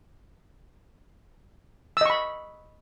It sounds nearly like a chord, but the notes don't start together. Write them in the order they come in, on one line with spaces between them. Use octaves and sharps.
E6 D#5 C#6 B5